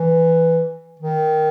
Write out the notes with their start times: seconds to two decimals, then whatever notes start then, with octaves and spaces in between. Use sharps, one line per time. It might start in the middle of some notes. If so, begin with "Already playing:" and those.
Already playing: E3
0.99 D#3